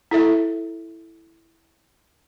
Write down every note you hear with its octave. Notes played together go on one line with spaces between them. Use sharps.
E4 A4 E5